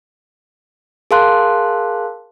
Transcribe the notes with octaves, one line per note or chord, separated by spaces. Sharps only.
G#4 A#4 F5 A5 C6 F#6